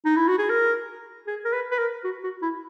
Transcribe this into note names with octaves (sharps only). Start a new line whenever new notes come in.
D#4
E4
F#4
G#4
A#4
G#4
A#4
B4
B4
A#4
F#4
F#4
E4